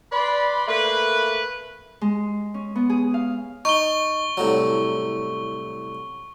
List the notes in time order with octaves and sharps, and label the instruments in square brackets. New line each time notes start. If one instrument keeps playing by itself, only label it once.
[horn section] B4 D5 B5 C6
A3 A#3 B4
[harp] G#3
C#4
B3
G#4
F5
[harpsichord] D#4 [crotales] C#6 G7
[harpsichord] C2 A2 F#3